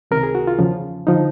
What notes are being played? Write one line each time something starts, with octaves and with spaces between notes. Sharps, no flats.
C#2 C3 D#3 A#4
G#4
F#4
F4
E2 C#3 F3
D3 F3 D#4